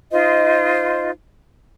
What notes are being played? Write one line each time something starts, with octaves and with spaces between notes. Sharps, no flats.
D#4 F4 C5 D#5